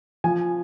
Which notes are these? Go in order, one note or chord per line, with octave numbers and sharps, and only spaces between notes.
F3 G#5